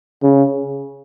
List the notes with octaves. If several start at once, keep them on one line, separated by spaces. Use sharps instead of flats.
C#3